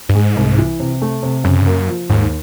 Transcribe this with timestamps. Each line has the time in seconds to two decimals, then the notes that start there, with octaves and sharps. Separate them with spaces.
0.09 G2
0.15 G#2 G#3
0.36 C2
0.58 E3
0.80 C3
1.02 A3
1.23 C3
1.44 F#2 C#3
1.60 G2
1.66 F#2 A#3
1.88 F3
2.09 D#2 G#2